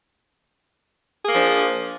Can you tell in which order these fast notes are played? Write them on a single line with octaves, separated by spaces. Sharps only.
G#4 A#3 F3 D4